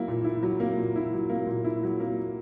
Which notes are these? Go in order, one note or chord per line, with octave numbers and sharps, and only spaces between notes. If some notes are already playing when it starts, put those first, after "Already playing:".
Already playing: F#3 A#3 E4
A#2
E4
F#3
A#3
A#2
E4
F#3
A#3
A#2
E4
F#3
A#3